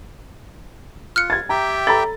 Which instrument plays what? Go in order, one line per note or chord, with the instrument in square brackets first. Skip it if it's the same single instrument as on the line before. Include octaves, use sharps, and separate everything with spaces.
[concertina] F4 [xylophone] F6 F#6 C#7
[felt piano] G#6 A6
[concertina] G4 E5 G5 [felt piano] A#5
[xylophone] A4 [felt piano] A#5 B5 A6